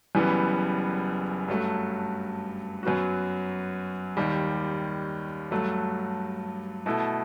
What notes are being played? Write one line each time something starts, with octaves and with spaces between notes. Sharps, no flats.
F#1 F#2 E3 G3 B3
G2 F#3 A3
F#2 F#3 B3 F#4
D#2 D#3 G3
G2 F#3 A3
B2 A3 E4 A4